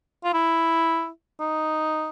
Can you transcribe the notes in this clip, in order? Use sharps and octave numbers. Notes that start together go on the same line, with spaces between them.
F4
E4
D#4